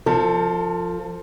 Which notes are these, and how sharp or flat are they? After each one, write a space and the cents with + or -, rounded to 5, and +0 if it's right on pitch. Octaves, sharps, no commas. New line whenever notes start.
F3 +0 A4 +35